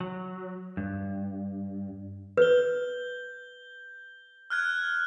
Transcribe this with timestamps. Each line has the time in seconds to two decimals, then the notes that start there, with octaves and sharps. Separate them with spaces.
0.01 F#3
0.77 G2
2.37 B4 G6 G7
4.50 F6 F#6 G#6